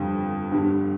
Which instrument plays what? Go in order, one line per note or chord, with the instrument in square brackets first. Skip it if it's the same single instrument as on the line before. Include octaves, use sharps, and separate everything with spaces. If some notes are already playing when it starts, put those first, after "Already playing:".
Already playing: [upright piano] G1 F2 D3 G3
G1 G2 D3 G3